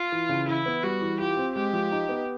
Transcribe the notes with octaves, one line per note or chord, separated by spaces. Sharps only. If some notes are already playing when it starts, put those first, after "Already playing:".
Already playing: F4
E3
C#3
E3 E4
B3
G3 F#4
E3
F4 G4
C4
G#3 G4
F3
D#4
B3